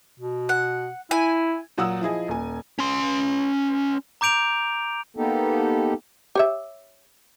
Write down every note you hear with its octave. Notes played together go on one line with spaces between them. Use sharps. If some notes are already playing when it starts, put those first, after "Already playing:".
B2
F#5
E4 G#5
A#2 F#3 F#5 D#6 E6
F3 E4 G#4 D#5
D#1 G#5
C#4 C6
A#5 D6 G6 D7 F7
A#3 B3 D#4 G4 A4
G4 C#5 E5